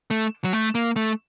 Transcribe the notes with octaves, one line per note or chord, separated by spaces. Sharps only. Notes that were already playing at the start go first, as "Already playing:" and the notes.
A3
F#3
A3
A#3
A3